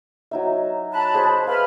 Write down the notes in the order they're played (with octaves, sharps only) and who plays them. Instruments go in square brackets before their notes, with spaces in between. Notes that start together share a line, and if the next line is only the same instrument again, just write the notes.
[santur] F#3 D#4 E5
[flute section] A5 B5 F#6
[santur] G#4 C5
[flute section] B4 B5 F6 [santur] F5